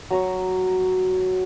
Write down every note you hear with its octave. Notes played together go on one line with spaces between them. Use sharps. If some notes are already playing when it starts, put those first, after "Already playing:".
F#3 A#5 C#6